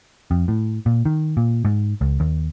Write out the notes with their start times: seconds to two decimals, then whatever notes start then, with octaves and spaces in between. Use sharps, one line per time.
0.31 F2
0.48 A2
0.86 A#2
1.05 D#3
1.37 A#2
1.65 G#2
2.01 C#2
2.20 D#2